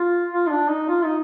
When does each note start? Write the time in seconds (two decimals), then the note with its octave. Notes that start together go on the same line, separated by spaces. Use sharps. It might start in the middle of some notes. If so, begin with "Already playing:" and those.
Already playing: F4
0.32 F4
0.47 D#4
0.51 D4
0.69 D#4
0.89 F4
1.05 D#4